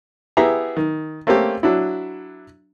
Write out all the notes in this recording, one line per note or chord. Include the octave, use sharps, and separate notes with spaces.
B3 E4 G4 G#4 E5 A#5
D#3
A3 A#3 C4 C#4 G4
F#3 D4 E4